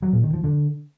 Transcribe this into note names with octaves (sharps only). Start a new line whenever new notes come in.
F#3
A#2
D#3
F3
D3